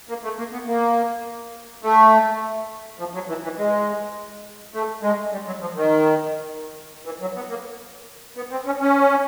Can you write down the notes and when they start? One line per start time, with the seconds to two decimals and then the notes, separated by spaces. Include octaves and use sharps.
0.09 A#3
0.24 A3
0.39 A#3
0.53 B3
0.67 A#3
1.83 A3
2.99 F3
3.14 F#3
3.29 E3
3.44 E3
3.58 G#3
4.74 A3
5.03 G#3
5.32 G3
5.46 F#3
5.61 F3
5.76 D#3
7.05 E3
7.21 F#3
7.36 B3
7.50 A#3
8.36 B3
8.51 C4
8.66 C#4
8.80 C#4